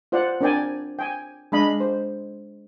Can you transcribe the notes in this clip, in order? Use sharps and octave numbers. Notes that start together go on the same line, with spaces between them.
F4 C5 D5 F#5
C4 D4 A#4 D5 G5 G#5
G5 G#5
G#3 D4 D#5 F5 B5
C5